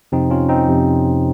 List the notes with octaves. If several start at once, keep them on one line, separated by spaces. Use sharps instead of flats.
F2 C3 F3 C4 D#4
C#4 F4
C4 D#4
F2 C3 F3